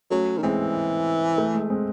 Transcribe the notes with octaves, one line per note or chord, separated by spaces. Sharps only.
F#3 A3 C#4
D#3
E3 G#3 C4
A3
G#3
G#3 C4